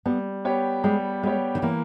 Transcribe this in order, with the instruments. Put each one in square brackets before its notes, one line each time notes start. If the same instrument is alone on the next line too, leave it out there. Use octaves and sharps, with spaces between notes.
[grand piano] G3 [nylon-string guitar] B3
[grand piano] B3 G4 C#5
[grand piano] G3 [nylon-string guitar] G#3
[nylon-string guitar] G#3 [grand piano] B3 G4 C#5
[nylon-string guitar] D#3
[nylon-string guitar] E3 [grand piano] A#3